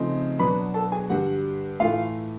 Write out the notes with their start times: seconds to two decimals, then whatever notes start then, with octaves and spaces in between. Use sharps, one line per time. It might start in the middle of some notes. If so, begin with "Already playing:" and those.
Already playing: C#3 F3 A3 C4 D#4
0.39 B2 F#3 B3 D4 B4 B5
0.74 A4 A5
0.92 G#4 G#5
1.10 G2 D3 G3 F#4 F#5
1.80 A2 E3 A3 F4 F5